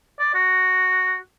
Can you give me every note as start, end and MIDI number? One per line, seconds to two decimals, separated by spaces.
0.19 0.33 74
0.34 1.18 66